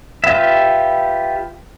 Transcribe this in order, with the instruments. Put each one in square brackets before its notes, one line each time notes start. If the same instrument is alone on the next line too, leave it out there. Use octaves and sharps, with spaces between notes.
[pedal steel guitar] F4 G4 B4 E5